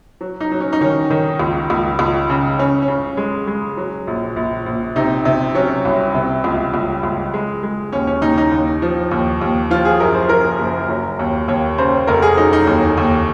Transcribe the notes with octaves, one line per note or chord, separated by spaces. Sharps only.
F#3
D#4
F#3
C#4
D#4
D#3 C#4
D#3
C#2
C#2
C#2
C#3
C#3 C#4
C#4
C#3
G#3
G#3
F#3
A#1
A#1
A#1
C3 D#4
C3
F#3 C#4
C2
C3
C#2
C#2
C#2
G#3
G#3
D#2 C#4
C#4
D#2 D#4
D#4
D#2
F3
D#2
D#2
F3 F4
G#4
F#2 A#4
C5
F3 A#4
F#1
F#3
D#2
D#2 C#5
C#3 C5
F1 A#4
G#4
F#3 D#4
D#4
D#2
D#2